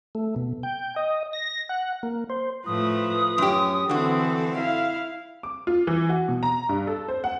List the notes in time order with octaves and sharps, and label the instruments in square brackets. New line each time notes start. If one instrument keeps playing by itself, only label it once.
[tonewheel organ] A3
B2
G5
D#5
A#6
F#5
A#3
C5
[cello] A2 A3 [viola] F3 B4 [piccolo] D#6
[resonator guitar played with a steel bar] F#2 G4 [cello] C#4
[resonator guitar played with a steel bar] D3 F#4 [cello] E3 [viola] C4 A4
[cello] E4 [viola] F5
[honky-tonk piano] D6
F4
E3
F#4
B2
A#5
G2
A4
C5
F#5